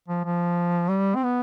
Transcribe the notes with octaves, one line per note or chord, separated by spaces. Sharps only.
F3
F3
G3
C4
B3